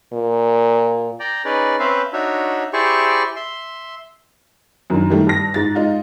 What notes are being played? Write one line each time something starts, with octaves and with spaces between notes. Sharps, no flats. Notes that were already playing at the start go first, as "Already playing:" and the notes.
A#2
D5 G5 A#5
C#4 D#4 G#4 B4 D5
C4 C#4 B4 C5 E5 F5
D4 D#4 F#4 C#5 E5
E4 G4 G#4 C5 D5 C#6
E5 C6
F#2 D#3 D4
D#3 G3 A3
G2 A#6
G#2 A6
G#3 D#4 F4